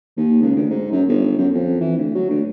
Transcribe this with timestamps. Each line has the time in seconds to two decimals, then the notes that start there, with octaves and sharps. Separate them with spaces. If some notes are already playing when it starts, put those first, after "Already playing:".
0.17 D#2
0.41 C#2
0.56 D2
0.70 G#2
0.91 F#2
1.08 G1
1.38 F#2
1.53 F2
1.80 E3
1.97 D2
2.15 F#3
2.29 D2